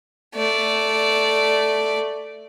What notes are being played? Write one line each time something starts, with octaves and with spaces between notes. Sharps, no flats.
A3 D5